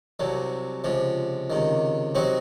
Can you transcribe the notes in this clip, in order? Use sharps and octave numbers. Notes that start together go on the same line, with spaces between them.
C2 C3 F#3
C#2 C3 F3
C#2 C3 D#3
C3 F#3 C4 D#4 F#4